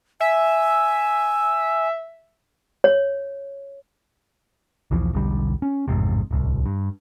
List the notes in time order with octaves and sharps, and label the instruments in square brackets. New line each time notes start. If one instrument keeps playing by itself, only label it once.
[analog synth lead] E5 [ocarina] G#5
[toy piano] C#5
[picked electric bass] B1 E2 E3 F3
E1 B1 D3 G3
C#4
A1 F2 G#2 C3
D1 C2
G2